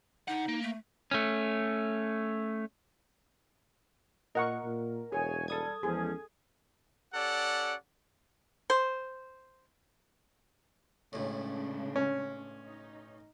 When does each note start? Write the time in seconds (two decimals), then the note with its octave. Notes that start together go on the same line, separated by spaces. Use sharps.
0.28 D3 D#4 F#5
0.48 A#3
0.62 A3
1.11 A3 C#4
4.35 A#2 A#4 D#5 F#5 C#6
4.64 A#2
5.12 E1 G#4 C#5 G#5
5.48 G3 A4 D#6 G#6
5.83 E2 F3 G#3 C#4 G#4
7.14 C#4 G4 A4 D5 F#5
8.70 C5
11.13 B1 A2 C#3 G#3 D4
11.96 C#4
12.65 D#4